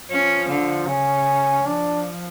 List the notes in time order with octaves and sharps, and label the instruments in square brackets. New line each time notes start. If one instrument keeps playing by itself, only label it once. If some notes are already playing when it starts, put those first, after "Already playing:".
[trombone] F3 [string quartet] C#4
[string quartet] D3
[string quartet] C#3 [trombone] C#4
[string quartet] F3 [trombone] D4